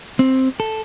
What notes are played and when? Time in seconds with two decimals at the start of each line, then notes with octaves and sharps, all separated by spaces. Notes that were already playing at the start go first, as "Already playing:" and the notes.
0.19 C4
0.60 A4